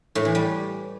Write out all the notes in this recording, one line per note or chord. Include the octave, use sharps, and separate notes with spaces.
A2
E3
G3